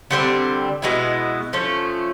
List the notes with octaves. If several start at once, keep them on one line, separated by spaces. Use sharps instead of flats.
D3 G3 C4
B2 G#3 B3 E4
F3 A3 C#4